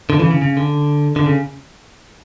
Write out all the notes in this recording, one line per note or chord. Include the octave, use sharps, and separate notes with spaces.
D3
C#3 E3
C#3
C#3
D3
D3
C#3